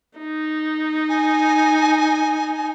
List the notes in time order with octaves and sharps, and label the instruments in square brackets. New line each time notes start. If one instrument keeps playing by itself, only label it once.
[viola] D#4
[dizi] G#5